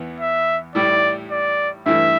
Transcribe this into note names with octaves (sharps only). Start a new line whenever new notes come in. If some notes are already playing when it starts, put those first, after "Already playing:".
Already playing: E2 E3 B3
E5
A2 G3 E4 D5
D5
G2 E3 A3 E4 E5